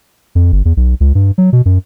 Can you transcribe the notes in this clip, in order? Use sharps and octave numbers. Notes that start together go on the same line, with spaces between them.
F2
G1
E2
B1
C#2
G2
F#3
B2
F#2